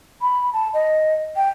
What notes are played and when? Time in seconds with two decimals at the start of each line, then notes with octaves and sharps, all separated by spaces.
0.22 B5
0.53 A5
0.74 D#5
1.36 G5